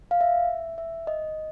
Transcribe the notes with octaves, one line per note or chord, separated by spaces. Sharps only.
F5
E5
E5
D#5